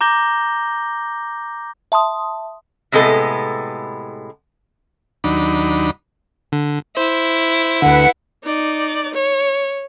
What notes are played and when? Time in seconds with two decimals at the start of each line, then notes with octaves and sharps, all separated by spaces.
0.01 A#5 D6 G6 A#6 G7
1.92 E5 A5 C6 D#6
2.92 A2 C3 G#3 B3 A4
5.24 D#2 F#3 D4 D#4 B5
6.52 D3
6.97 E4 C5
7.82 D2 D3 B4 F#5
8.44 D#4 D5
9.14 C#5